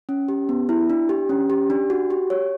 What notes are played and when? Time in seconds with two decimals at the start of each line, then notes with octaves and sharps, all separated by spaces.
0.09 C#4
0.28 G4
0.49 B3
0.69 E4
0.90 D4
1.09 G4
1.29 C#4
1.50 G4
1.70 D4
1.90 F#4
2.10 G4
2.30 C#5